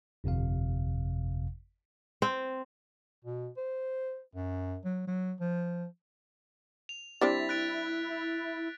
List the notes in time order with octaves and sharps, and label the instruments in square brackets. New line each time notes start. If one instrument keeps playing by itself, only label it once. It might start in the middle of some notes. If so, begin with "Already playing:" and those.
[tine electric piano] G1 F2 C3 F5
[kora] C4
[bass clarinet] B2
C5
F#2
F#3
F#3
F3
[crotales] F7
[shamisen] G3 C4 D4 [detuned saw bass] E4 [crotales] A6 B6
[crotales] F#6 A6 D7
[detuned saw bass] E4